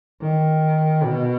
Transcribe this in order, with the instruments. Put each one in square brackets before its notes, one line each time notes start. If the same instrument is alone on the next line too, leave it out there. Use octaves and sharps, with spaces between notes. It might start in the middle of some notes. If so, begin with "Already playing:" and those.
[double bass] D#3
B2